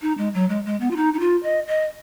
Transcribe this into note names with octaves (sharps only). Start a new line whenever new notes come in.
D#4
G#3
F#3
G#3
G#3
B3
F4
D#4
D#4
F4
D#5
D#5